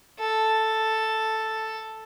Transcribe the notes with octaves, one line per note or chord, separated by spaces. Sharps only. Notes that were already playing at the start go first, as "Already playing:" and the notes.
A4